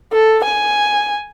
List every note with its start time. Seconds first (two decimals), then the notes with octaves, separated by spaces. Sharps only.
0.13 A4
0.44 G#5